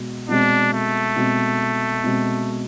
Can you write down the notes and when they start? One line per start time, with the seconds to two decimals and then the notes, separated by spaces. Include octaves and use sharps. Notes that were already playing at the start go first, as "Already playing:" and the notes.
Already playing: B2 G#3
0.29 B2 G#3 C4 D4
0.73 A3
1.16 B2 G#3 C4
2.04 B2 G#3 C4